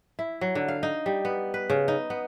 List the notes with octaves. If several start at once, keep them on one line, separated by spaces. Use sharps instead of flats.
E4
F#3
D3
F5
D#4
G3
B3
B4
C#3
D#4
B3